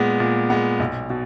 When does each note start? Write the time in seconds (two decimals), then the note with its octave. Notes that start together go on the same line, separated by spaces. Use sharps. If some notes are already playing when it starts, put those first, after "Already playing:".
Already playing: A#2 G#3 B3
0.20 A#2
0.50 G#3 B3
0.80 B1
1.10 B2